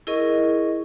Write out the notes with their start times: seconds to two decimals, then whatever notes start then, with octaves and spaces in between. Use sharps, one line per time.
0.07 E4 G#4 A#4 D#5 C#6